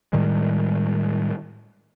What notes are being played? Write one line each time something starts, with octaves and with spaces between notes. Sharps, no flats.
A2 D#3 G3 G#3